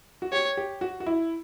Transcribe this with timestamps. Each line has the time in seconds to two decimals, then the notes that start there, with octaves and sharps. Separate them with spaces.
0.22 F#4
0.33 G4 C#5
0.57 G4
0.81 F#4
1.00 F#4
1.06 E4